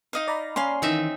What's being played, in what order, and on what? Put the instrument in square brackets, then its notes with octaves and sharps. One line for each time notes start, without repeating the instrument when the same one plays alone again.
[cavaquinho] D#4 D#5 F5
[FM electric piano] D5 A#5 B5
[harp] C#4 [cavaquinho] F5 C6
[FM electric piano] D#3 E3 [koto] C4 D#4 E5